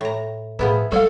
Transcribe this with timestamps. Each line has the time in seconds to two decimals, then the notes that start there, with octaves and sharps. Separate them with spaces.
0.01 A2 A#5
0.59 A2 F3 B3 E4 G#4 B4
0.92 G3 A4 C#5 F5